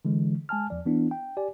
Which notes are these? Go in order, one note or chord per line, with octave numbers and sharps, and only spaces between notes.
D3 E3 G#3
G#3 G#5 A5 F6
E2 F3 D5
E3 B3 D4 E4
G5
G4 D5 G#5